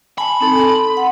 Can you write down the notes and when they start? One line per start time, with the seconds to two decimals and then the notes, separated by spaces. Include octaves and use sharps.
0.18 G#5 A5 B5
0.41 C4 D#4 A4
0.61 C6
0.97 F#5